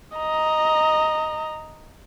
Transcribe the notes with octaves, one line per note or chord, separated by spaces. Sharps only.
D#5 A#5